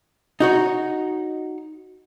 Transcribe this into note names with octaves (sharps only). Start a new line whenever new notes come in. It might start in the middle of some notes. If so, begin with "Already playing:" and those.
D#4 F#4 C#5